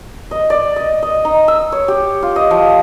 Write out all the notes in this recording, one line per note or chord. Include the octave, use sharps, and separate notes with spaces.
D#5
D5
D#5
D#5
D#4
E6
C#5
G4
F4
D#5
F3